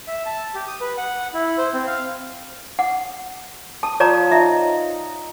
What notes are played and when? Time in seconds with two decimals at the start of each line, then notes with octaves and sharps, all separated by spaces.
0.07 E5
0.26 A5
0.55 G4
0.67 D#6
0.81 B4
0.98 F#5
1.34 E4
1.58 C5
1.74 C4
1.87 F5
2.79 F#5
3.83 A5 D#6
4.00 F3 C#5 D5 A#5
4.32 D#4 E5